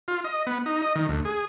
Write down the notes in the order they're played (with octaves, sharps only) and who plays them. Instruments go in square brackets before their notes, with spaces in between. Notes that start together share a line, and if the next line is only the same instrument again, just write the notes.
[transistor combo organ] F4
D#5
B3
D#4
D#5
D#3
D2
G#4